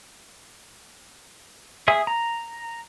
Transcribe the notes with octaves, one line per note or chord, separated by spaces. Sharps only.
G#4 E5 D#6
A#5